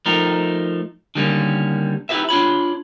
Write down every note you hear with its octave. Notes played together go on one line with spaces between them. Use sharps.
F3 A3 D#4 A#4
D3 D#3 G3 A#3 C4 C#4
D#4 E4 G4 G#4 B4 E5
D4 F4 C#5 B5